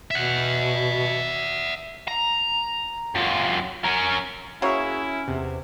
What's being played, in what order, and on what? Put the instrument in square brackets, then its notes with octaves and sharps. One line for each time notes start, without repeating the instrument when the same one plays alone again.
[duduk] B2 [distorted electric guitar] E5 F#5
[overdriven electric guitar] A#5
F#2 F4
C#4 A#4
[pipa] A#3 C#5 [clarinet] C#4 [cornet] E4 [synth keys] F#4 G#4 E5
[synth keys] E2 C3